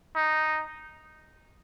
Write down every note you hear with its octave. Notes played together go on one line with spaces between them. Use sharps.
D#4